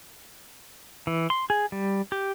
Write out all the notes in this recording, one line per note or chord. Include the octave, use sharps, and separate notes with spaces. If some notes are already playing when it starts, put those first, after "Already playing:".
E3
C6
G#4
G3
G4